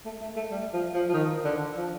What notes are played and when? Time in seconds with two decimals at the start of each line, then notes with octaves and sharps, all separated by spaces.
0.06 A3
0.21 A3
0.36 A3
0.51 G3
0.73 F3
0.94 F3
1.09 F3
1.14 D#3
1.45 D3
1.77 F3